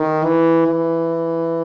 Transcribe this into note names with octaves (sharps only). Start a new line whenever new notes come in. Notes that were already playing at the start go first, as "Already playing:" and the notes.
Already playing: D#3
E3
E3